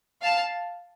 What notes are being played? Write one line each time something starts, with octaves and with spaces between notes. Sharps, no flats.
F5 A5